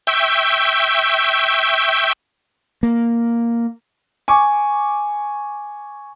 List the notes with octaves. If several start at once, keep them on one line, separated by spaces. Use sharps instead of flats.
E5 G5 C#6 E6 G6
A#3
G#5 C#6 D6